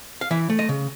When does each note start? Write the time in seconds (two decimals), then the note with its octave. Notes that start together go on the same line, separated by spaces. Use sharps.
0.21 F5
0.31 E3 E5
0.50 A3
0.59 D#5
0.69 C#3